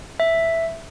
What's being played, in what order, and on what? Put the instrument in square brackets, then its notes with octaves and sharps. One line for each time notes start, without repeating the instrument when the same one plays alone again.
[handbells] E5